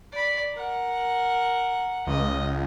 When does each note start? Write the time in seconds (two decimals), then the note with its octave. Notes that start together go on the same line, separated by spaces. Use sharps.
0.12 D5 B5
0.53 A#4 F#5
2.07 C#2 D#5